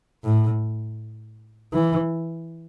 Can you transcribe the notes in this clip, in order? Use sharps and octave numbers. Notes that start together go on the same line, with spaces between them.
A2
E3